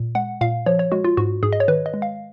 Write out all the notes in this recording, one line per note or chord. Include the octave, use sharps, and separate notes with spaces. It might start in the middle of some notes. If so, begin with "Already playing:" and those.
Already playing: A#2
G#3 F#5
A#2 F5
F3 C#5
C#5
G#3 F#4
F4
G#2 F#4
G#2 G#4
D#5
C#5
D#3 B4
D#5
G#3
F5